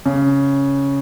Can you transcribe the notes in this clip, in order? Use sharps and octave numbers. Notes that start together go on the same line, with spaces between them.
C#3